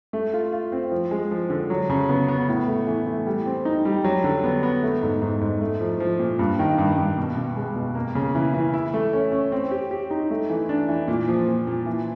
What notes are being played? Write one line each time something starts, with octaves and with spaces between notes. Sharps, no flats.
A3
F4
F4
C4
F3
G#3
F3
D3
F#3
C#3
B3
B3
A2
A3
E3
A3
G3
C4
D#4
G3
F#3
D3
B3
B3
A3
G#2
G#2
G#2
A3
F3
F3
A#2
G2
D#3
G2
G2
B2
B2
G#3
B2
A#3
C#3
E3
E3
E4
A3
C#4
C#4
C4
G4
G4
D#4
A3
E3
D4
E3
A#2
F3
A#2
A#2
E3